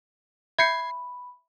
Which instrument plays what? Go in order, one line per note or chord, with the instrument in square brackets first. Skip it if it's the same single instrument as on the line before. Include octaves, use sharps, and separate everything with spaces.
[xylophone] E5 G6 C#7 [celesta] B5 [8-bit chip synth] G#6 C7